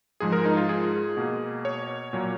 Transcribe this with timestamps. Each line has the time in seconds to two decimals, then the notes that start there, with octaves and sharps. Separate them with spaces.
0.20 G#2 F3 G#3 G#4
0.32 A#4
0.45 D#4
0.57 F4
0.69 G#4
1.17 B2 A#3
1.65 C#5
2.13 A#2 F#3 A#3